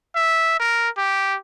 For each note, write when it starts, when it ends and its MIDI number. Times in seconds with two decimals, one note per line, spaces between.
0.15 0.58 76
0.59 0.89 70
0.98 1.36 67